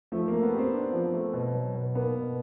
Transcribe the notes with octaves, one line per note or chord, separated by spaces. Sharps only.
F3 A3
A#3
A3
B3
C4 G4
D4
F3
A3
B2
F#3
B2
A#3 B3
B2